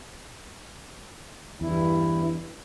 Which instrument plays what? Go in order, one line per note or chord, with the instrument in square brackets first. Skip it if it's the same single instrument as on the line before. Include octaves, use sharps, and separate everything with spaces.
[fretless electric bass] E2 [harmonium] G2 E4